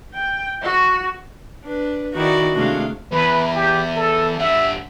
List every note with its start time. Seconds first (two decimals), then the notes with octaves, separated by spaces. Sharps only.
0.14 G5
0.63 F#4
1.64 D4 B4
2.15 D#3 D#4 E4 F#4 D5
2.55 C3 G#3 A3 D4 F5
3.11 E2 B4
3.55 G4
3.96 A4
4.39 G2 E5 F#5